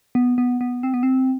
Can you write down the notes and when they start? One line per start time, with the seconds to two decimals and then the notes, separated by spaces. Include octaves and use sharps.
0.15 B3
0.38 B3
0.61 B3
0.83 C4
0.94 B3
1.03 C4